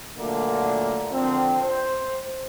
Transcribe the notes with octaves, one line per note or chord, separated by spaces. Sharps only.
A#2 D3 F#3 A3 A#3
D3 F3 C4
C5